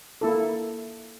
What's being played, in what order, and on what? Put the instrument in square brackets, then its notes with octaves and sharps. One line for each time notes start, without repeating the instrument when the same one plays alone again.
[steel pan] A#3 E4 A4